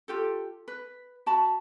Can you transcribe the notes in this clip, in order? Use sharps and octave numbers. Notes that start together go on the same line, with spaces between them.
F4 G4 A4
B4
F#4 A5 B5